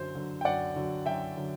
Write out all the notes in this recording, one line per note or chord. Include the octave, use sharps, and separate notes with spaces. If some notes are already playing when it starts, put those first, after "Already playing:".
Already playing: F#2 D3 F#3 C5
D3 F#3
G5
F#2 D5 F#5
D3 F#3
F#2 E5 G5
D3 F#3